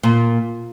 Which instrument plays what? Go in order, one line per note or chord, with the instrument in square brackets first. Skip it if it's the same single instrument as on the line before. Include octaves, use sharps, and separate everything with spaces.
[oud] A#2